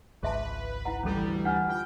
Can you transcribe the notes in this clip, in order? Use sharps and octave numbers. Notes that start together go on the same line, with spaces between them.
G#1 C#2 G#4 B4 E5 A5
E4 F#5 A#5
D2 E3 G3 C#4 A4
D4 F#5 F6
F4 G5